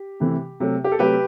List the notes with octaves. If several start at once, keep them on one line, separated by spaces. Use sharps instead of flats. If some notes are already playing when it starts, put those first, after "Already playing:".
Already playing: G4
C3 E3 A3
C3 F#3 A3
G4
A4
C3 F#3 A3 G4 B4